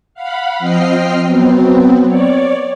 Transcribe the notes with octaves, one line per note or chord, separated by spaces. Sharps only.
F5 F#5 B5
F3 C4 D#5 G5 F6 C7
F#3 B3 C4
C#5 D5